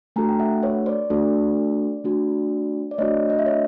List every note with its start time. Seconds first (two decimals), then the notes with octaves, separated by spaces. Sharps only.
0.16 A3 D4 F#4 A4 G#5 A#5
0.29 G5
0.40 E5 F#5
0.63 B4 C#5
0.86 C5 D5
1.10 A3 D4 F#4 A4
2.04 A3 D4 F#4
2.91 D5
2.98 A3 D4 F#4 C#5 D#5
3.30 D#5
3.39 E5
3.46 C#5 D#5